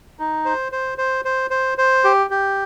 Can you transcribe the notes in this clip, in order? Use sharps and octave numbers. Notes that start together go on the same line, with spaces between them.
D#4
C5
C5
C5
C5
C5
C5
G4
G4